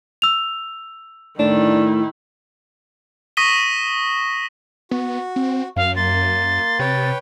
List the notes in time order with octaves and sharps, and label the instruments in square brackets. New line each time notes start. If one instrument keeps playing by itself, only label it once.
[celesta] E6 F7
[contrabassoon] A2 [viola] D#3 E4 [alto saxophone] D4
[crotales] C#6 D#6 A#6 B6 D#7 G7
[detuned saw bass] B3 [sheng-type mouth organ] F#4
[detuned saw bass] C4
[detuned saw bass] F#2 [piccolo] F5
[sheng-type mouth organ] A#3 C6 [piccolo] A6
[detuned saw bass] C3 [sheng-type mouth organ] B4 C#5 G5